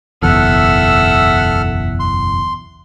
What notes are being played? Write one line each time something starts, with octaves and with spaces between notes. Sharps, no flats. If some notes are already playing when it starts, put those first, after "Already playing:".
F#1 B1 E2 A4 E5 F#5 F6
C6